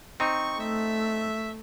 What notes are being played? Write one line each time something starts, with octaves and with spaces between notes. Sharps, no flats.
C4 D#4 C#6
A3 E5